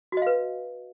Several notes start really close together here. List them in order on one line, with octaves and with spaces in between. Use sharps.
F#4 D#5 F5 B4